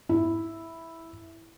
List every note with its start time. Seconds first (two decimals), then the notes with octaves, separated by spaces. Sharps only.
0.09 E4